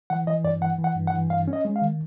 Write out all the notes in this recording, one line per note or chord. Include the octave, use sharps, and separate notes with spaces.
E3 F#5
E3 D#5
G2 D5
E3 F#5
E3
F#5
G2
F#5
E3
G2 F5
C#4
D#5
G#3
F5
D#3